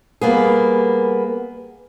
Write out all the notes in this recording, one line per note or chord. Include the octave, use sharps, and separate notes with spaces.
G3 A#3 B3 G#4